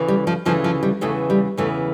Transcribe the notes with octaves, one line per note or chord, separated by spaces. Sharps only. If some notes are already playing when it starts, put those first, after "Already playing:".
Already playing: D2 C#3 E3
G3
F3
D2 C#3 E3 F3
F3
G3
E2 C#3 E3 A3
G3
E2 C#3 E3 A3